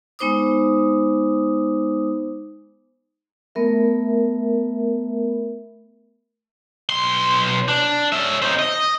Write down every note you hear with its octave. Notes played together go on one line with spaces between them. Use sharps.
G#3 B3 D#4 C5 D6 D#6
A3 B3 A#4 E5
B1 C6
D4
C#4 E5
C4 D#4
D#5